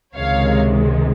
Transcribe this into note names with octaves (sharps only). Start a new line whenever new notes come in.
C#2 C3 D#3 G#3 C#5 F5